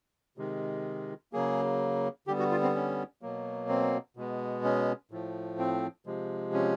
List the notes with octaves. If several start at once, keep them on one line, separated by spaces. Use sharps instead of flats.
C3 D#3 G#3
C#3 F#3 A#3 G#4
D3 G3 B3 G4
F#4
F4
C4
C#4
B2 F#3 A#3
C4
B2 G#3 B3
C#4
A2 F3 A3
C4
C3 F3 G#3
C#4